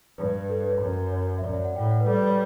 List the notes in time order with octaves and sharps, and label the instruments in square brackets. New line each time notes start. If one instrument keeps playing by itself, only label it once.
[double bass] G2 [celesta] B4
[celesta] A4
B4
C#5
[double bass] F#2
[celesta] C#5
E5
[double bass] F#2 [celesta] D5
[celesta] E5
F#5
[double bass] A2 [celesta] G5
[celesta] F#5
B4
[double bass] G3 [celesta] A4
[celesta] B4
C#5